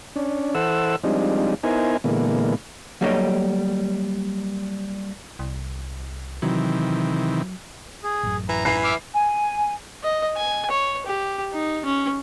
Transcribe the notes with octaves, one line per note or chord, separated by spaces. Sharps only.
C#4 D4
E3 A4 C5 F#5 E6
F3 G3 G#3 C4 D4 D#4
B3 D#4 E4 A#4 C5 G#5
A#2 D3 E3 G#3 A#3 B3
F#3 G3 A#3 A4 C#5 D#5
C2
C3 D#3 E3 F#3
G#4
A1 F#2
E3 A#5
E3 C7
E5 D6 F6
G#5
D#5
G#5
C#5
G4
D#4
C#4